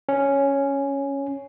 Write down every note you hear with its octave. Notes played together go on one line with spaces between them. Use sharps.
C#4